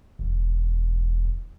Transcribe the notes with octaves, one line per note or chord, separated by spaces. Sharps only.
E1